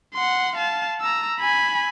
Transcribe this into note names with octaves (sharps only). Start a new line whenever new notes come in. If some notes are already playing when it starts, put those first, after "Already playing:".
F#5 C6
F5 A5
A#5 E6
G#5 B5